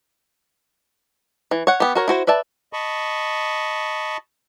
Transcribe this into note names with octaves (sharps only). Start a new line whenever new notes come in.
E3
C#5 F#5
B3 G4
F#4 A#4 C#5
E4 F#4 C5
B4 D5 E5 A5
D#5 A5 B5 C#6